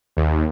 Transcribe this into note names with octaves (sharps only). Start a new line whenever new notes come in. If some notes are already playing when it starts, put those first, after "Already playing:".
D#2